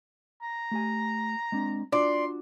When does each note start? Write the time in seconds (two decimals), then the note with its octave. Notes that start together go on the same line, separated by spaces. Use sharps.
0.42 A#5
0.71 A3 G4 G#5
1.52 G#3 C4 D4
1.92 D4 F4 F#4 D5 C6